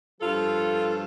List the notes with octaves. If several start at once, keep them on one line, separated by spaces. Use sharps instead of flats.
G2 F3 F4 A4